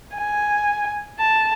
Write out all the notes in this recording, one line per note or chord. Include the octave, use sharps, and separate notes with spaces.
G#5
A5